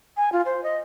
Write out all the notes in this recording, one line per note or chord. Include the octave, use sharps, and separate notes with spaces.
G#5
F4
C5
D#5